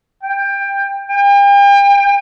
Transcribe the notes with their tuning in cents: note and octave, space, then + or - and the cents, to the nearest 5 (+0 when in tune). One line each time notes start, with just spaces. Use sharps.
G5 +20
G5 +40